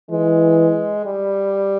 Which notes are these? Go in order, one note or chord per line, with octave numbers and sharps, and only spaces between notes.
E3 G#3
G3